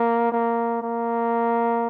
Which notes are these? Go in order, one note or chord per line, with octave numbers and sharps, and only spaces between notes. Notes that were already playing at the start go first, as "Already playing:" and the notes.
Already playing: A#3
A#3
A#3